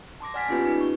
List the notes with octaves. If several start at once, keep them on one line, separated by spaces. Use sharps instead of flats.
A5 C6 D6 A#6
D5 F#5 G#5 F6 A6 B6
A#3 B3 C#4 F4 G4 B4
C#4 D#4 B4
C#6